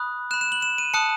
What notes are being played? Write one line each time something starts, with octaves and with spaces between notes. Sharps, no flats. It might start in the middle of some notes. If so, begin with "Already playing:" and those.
Already playing: B5 D#6 F#6
B5 F#6 E7
E7
F#7
E7
D#7
A5 D#6 F#6 C#7